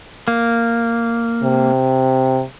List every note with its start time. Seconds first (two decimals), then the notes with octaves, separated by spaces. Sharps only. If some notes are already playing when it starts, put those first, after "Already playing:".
0.28 A#3
1.43 C3